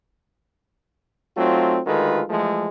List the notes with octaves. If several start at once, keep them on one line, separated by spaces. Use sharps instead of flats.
F#3 A3 C4 D#4 F4
D2 D#3 G#3 F4 A4 B4
E3 F3 G#3 A3